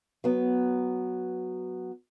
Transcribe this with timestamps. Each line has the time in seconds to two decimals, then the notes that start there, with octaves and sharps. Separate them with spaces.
0.24 F#3 B3